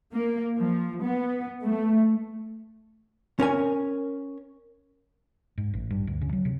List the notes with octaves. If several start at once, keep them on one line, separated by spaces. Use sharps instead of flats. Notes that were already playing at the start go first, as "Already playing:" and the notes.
A#3
F3
B3
A3
C#4 A#4 G#5
G#2
A1
G2
D2
C#3
F#3
C3